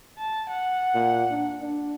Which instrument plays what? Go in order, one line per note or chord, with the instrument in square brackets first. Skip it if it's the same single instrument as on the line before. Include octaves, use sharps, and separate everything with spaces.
[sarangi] A5
F#5
[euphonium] A#2
D4
D4